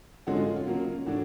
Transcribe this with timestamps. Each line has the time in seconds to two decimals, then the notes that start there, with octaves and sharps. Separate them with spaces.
0.27 D3 F3 G#3 C#4 F#4
0.37 F4
0.56 F4
0.67 C#3 F#3 A#3
1.07 A2 E3 A3 D4 F#4